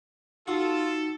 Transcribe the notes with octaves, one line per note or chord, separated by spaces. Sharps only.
D#4 F4 F#4 A4